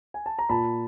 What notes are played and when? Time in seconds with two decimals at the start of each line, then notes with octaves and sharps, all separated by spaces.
0.14 G#5
0.26 A5
0.39 A#5
0.49 A#2 A5 B5